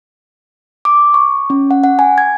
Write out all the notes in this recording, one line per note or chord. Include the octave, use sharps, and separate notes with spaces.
D6
C#6
C#4
F#5
F#5
G#5
G#6